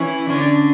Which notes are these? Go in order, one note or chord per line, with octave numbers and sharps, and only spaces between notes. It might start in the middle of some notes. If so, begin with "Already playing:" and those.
Already playing: E3 C#4 E4
D3 C#4 D4